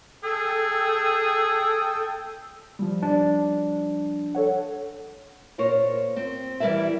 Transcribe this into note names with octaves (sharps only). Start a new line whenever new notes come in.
G#4 A4 G5 E6
F3 G3
D4
A4 C#5 F#5
A#2 A#4 C5 C#5
C4
E3 G3 E4 A#4 D5 E5